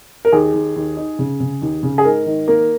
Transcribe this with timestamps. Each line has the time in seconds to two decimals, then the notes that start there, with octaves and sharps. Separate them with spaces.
0.25 A#4
0.32 D#2 G#4
0.54 D#2
0.76 D#2
0.97 D#4
1.19 C#3
1.40 C#3
1.62 D#2
1.83 C#3
1.98 G#4
2.05 G#2 A#4
2.26 D#3
2.48 A#3 A#4